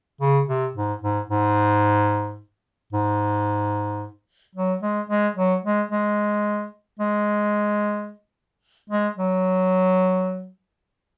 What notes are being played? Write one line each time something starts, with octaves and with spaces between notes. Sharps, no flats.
C#3
C3
G#2
G#2
G#2
G#2
F#3
G#3
G#3
F#3
G#3
G#3
G#3
G#3
F#3